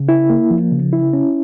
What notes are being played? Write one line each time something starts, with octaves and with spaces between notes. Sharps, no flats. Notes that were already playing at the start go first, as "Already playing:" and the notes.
Already playing: C#3
E4
A#3
F3
C#3
E4
C#4